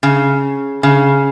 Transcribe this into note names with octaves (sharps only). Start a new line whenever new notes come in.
C#3
C#3